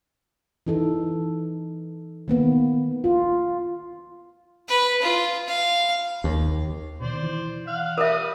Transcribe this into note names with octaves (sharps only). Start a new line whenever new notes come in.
E3 D#4 A4
D#3 A#3 B3
F4
B4
F4
F5
D#2
B2 D#3 C5 D5
E3
F5 F#5 F6
G3 A#4 E5 D#6